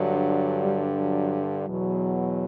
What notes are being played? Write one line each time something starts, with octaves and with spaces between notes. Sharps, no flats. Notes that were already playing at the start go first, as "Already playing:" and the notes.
Already playing: G2 D3 F#3
G3
F#3
E2 B2 F#3